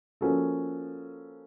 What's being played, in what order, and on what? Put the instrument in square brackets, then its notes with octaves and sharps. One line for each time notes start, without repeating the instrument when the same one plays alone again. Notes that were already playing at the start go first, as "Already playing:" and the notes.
[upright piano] F3 A#3 C#4 F#4 A4